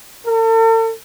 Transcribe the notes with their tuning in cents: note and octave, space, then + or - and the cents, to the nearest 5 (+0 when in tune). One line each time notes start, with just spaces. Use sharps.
A4 +45